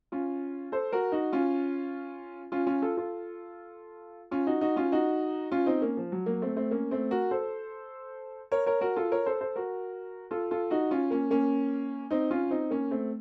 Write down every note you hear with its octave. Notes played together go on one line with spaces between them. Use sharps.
C#4 F4
A4 C5
F#4 A#4
D#4 F#4
C#4 F4
C#4 F4
C#4 F4
F4 A4
F4 A4
C#4 F4
D#4 F#4
D#4 F#4
C#4 F4
D#4 F#4
C#4 F4
C4 D#4
A#3 C#4
F3
F#3
F#3 A#3
A3 C4
A3 C4
A#3 C#4
A3 C4
F#4 A#4
A4 C5
A#4 C#5
A#4 C#5
F#4 A#4
F4 A4
A#4 C#5
A4 C5
A4 C5
F#4 A#4
F4 A4
F4 A4
D#4 F#4
C#4 F4
A#3 C#4
A#3 C#4
C4 D#4
C#4 F4
C4 D#4
A#3 C#4
A3 C4